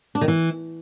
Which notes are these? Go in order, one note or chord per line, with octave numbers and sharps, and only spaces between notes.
D4
D#3
E3